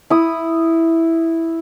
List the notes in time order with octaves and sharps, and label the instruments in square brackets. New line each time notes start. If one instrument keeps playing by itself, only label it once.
[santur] E4 D#6